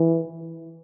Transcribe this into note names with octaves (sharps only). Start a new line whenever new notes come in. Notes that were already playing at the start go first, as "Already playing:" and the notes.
Already playing: E3